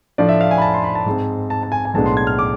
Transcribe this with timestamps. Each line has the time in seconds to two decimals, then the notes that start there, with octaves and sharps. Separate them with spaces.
0.18 A2 F3 A3 D4 D5
0.29 E5
0.41 F5
0.51 G#5
0.58 B5
0.62 A5
0.74 C6
0.84 B5
0.95 A5
1.06 G#2 G#3 C4
1.50 A5
1.63 A5
1.72 G#5
1.85 G#5
1.94 B1 A2 G#3 B3 D4 A5
2.06 C6
2.17 G#6
2.27 F6
2.39 D6